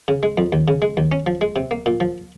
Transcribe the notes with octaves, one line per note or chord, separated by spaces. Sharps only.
C#3
G#3
F2
D#2
C#3
G#3
D#2
C#4
F3
G#3
C3
A#3
A#2
F3